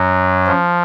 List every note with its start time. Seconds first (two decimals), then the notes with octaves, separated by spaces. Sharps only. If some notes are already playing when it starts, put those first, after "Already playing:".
Already playing: F#2 F#3
0.46 F3